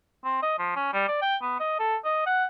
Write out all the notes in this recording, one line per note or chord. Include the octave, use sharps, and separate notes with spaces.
C4
D#5
F3
C#4
G3
D5
G5
B3
D#5
A4
D#5
F#5